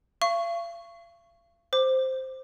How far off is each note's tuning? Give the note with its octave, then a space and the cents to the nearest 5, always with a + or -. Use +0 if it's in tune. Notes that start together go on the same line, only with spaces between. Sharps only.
F5 -40 C#6 +0
C5 +0 D6 +15